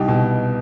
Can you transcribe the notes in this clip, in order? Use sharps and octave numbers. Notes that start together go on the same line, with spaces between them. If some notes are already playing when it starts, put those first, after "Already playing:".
Already playing: C2 D#4 G4
B2